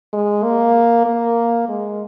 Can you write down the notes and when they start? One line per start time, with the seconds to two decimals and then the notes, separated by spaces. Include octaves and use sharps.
0.13 G#3
0.44 A#3
1.06 A#3
1.69 G#3